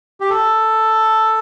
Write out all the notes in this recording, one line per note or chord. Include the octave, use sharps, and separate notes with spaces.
G4
A4